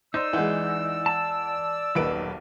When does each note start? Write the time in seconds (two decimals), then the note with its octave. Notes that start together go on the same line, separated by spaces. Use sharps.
0.14 D#4 C5 D5 E6
0.33 E2 E3 G#3 F#5 G6
1.06 A5
1.95 D#1 B1 A#3 D#4 B4 D7